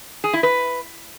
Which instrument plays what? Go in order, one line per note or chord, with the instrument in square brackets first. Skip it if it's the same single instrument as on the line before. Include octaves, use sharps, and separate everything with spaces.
[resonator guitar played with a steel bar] G#4
E4
B4